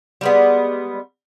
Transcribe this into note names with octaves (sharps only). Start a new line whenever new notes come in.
G3 G#3 B3